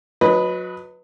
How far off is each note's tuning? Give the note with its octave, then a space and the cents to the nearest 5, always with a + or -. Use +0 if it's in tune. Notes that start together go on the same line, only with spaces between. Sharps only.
F#3 -30 B4 +0 D#5 +0